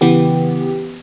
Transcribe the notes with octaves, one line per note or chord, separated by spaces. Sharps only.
C#3 E3 B3 G4